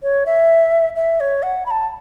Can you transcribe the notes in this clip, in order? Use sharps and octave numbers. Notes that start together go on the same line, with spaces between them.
C#5
E5
E5
C#5
F#5
B5
A5